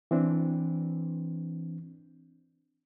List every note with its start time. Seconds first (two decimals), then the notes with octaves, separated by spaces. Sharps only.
0.11 E3 C4 D4